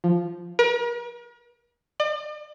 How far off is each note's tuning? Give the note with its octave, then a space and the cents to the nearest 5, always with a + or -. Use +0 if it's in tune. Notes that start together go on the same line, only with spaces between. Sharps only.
F3 -5
A#4 +45
D5 +45